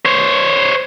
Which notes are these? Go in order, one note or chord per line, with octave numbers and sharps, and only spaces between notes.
C5 C#5